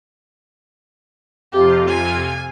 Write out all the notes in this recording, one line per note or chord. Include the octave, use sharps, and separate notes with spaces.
F2 C3 F4 G4
G#5